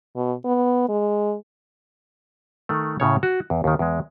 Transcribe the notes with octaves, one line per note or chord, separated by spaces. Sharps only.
B2
B3
G#3
D#3 A3
A2 C#3 C#5
F#4
E2
D#2 D#3
E2 G#3